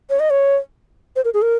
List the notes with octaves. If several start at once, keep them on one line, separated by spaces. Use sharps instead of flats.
C#5
D#5
C#5
C5
A#4
G#4
A#4